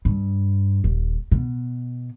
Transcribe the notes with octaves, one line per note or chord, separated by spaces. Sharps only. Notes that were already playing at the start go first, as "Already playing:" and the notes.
G2
D#1
B2